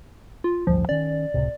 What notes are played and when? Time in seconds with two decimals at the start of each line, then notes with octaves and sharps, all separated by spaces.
0.44 F4
0.67 A1 D2 G2 F3
0.89 D#3 C#4 D5
1.34 C#2 A2 C3